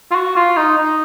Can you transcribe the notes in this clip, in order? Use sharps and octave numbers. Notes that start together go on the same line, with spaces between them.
F4
F#4
F4
D#4
D#4